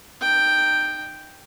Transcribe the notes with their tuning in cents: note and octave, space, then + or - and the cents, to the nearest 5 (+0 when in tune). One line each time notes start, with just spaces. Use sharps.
D#4 -25 G5 +0